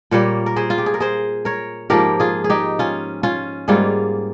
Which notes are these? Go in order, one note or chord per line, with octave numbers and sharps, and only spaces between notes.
A#2 G3 A#3 A#4 C#5
A#4
G#4 C5
F4
G4
G#4
A#4
G#4 C5
A#4 C#5
G#2 F3 A#3 G4 A#4
F4 G#4
G#4
D#4 G4
C#4 F4
C#4 F4
G#2 G3 A#3 F4 G#4